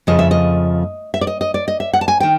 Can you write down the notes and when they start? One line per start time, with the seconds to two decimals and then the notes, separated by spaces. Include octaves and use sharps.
0.07 F2 C#3 F3 A3 D#5
0.19 E5
0.31 D#5
1.14 E5
1.21 D5
1.27 D#5
1.41 D#5
1.54 D5
1.68 D#5
1.80 E5
1.93 F#5
2.01 A5
2.08 G#5
2.20 D#3 G5